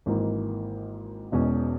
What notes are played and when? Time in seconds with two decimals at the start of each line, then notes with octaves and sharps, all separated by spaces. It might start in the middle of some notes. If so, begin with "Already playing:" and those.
0.06 G#1 G#2 E3 A#3
1.32 E1 E2 B2 G#3 C#4